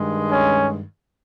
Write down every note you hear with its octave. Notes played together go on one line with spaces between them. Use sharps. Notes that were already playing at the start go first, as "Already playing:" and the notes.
Already playing: G2 D#3 G#3
C#4